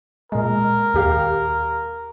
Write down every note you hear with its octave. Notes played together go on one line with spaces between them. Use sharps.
A#2 G#3 A#4
D#2 G4 F5